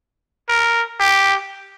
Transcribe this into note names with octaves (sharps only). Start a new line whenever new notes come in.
A#4
G4